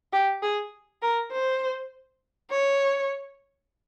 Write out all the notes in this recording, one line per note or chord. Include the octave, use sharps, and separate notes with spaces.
G4
G#4
A#4
C5
C#5